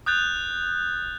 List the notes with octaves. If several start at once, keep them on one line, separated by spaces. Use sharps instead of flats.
D#6 F#6 G6 A6 F7